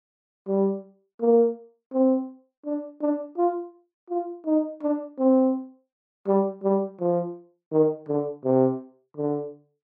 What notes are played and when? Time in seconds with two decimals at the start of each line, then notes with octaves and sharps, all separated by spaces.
0.48 G3
1.20 A#3
1.93 C4
2.65 D4
3.01 D4
3.38 F4
4.10 F4
4.46 D#4
4.82 D4
5.19 C4
6.27 G3
6.64 G3
7.00 F3
7.72 D#3
8.08 D3
8.44 C3
9.17 D3